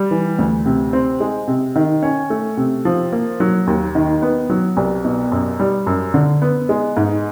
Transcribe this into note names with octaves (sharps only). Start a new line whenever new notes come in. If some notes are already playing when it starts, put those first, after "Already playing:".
Already playing: G3
E3
D2
C3
C4
G#3
C3
D#3
C#4
A3
C3
F3
A#3
F#3
D#2
D#3
B3
F#3
C2
B2
F#2
G3
F#2
D3
B3
G#3
G#2